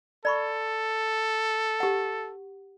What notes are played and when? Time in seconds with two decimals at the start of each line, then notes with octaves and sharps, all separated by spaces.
0.25 A4 D5 B5 C#6
1.80 G4 F#5